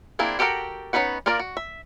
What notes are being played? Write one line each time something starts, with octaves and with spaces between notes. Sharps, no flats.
A#3 C4 D4 E4 G#4
F#4 G4 A4 A#4 F#5
B3 C#4 D#4 B4 F#5
A#3 F4 A#4 D5
F#4
E5